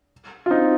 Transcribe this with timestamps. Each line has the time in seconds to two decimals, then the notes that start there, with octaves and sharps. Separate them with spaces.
0.46 F4
0.50 C4 D#4